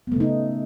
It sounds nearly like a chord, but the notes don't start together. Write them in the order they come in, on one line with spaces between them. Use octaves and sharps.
B3 A3 C#3 D#4